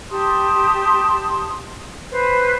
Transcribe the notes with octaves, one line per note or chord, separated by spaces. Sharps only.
G4 A5 C6 D#6
B4 C5